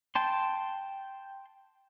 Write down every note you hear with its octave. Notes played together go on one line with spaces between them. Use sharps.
G5 A5 C6